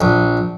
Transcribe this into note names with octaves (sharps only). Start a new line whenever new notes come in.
A#1